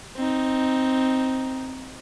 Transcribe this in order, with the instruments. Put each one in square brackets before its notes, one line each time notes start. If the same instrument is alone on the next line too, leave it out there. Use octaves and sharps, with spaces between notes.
[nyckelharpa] C4 D#4